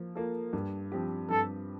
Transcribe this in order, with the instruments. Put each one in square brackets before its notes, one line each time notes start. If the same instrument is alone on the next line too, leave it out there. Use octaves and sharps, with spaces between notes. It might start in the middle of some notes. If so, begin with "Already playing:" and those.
Already playing: [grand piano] F3 A#3
A#3 F4 A4
G2
F3 C4 G4
[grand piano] G2 [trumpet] A4